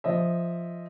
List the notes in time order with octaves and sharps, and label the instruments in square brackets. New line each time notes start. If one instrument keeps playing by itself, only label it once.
[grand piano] F3 D#5 E5